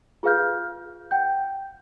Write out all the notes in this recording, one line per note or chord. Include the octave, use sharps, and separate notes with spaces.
F4 G#4 B4 F5 F6 G6
F#5 G5 G6